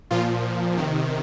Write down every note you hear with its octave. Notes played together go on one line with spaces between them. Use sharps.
A#2 F3 F4
C3 D#3